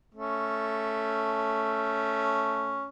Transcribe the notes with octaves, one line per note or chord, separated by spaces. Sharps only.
A3 C#4